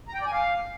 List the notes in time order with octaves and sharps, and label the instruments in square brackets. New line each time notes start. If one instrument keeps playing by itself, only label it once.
[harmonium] A#5
G5
D5
G#5
F5